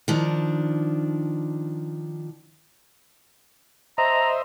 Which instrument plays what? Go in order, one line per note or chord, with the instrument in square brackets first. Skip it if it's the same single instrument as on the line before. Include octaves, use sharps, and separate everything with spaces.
[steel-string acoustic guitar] D#3 F3 D4
[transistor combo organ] C5 D#5 E5 [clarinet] A#5